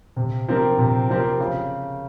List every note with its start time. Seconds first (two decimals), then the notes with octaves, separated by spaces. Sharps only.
0.16 C3
0.48 F3 C4 G4 A#4
0.78 C3
1.09 F3 C4 G4 A#4
1.40 C#3